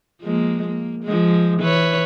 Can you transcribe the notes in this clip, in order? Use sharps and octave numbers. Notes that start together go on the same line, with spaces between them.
F3 G#3 A#3
A#3
F3 G#3
E3 B4 C#5